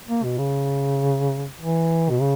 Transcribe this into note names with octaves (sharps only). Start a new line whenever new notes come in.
A#3
B2
C#3
E3
B2
C#3